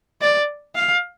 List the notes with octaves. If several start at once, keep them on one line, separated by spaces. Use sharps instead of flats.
D5
F5